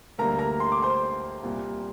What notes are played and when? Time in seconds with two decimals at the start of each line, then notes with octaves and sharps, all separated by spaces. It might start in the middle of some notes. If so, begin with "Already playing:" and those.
0.18 D2 D3 G3 A#3 A#4 A#5
0.39 A#4 A#5
0.60 C6
0.72 D6
0.82 C5 C6
1.43 C2 A#2 G3 A#3